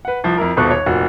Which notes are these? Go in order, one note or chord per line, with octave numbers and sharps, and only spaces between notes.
B4 F#5
C2 F3 A5
F2 E4 A#4
D#1 G#1 B2 A4 C#6 F#6
C#5
F1 A#2 F#4